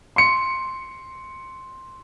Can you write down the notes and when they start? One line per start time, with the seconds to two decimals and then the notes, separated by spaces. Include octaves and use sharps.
0.16 C6 C#7